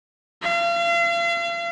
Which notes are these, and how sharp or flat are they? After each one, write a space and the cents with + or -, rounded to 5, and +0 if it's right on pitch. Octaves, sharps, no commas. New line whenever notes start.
F5 -40